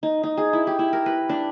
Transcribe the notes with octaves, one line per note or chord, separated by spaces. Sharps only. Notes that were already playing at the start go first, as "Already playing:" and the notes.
D#4
D#4
G#4
E4
G4
E4
A#4
B4
D4